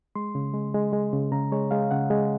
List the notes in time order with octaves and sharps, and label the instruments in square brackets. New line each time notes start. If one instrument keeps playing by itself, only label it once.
[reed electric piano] G#3 C6
C#3
G#3
G#3
G#3
C#3
C#3 A#5
G#3 C#5
G#3 F5
C#3 F#5
G#3